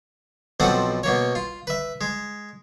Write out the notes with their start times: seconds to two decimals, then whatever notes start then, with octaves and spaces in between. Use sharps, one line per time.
0.60 B1 F3 C4 A4 F#5
1.03 B2 A#3 C#5
1.35 F4
1.67 B4 E5
2.01 G#3